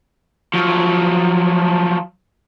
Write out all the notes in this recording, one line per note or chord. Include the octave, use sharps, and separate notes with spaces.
F3 F#3